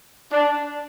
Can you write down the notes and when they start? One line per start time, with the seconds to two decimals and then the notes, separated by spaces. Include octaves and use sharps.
0.31 D4